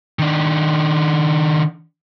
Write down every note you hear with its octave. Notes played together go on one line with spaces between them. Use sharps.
D#3 D4